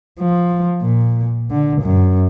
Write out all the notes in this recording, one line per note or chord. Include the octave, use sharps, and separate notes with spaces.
F3
A#2
D3
F#2